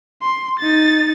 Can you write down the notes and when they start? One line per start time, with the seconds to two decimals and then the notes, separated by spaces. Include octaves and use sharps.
0.22 C6
0.59 D#4 A6